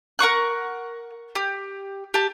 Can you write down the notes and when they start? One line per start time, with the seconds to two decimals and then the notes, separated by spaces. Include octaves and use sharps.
0.19 A#4 F#5 C#6 F#6
1.35 G4
2.14 G4 A5